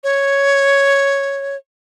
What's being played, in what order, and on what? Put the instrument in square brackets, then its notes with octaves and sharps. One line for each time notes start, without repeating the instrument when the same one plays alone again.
[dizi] C#5